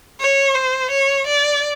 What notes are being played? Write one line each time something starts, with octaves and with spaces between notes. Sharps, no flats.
C#5
C5
C#5
D5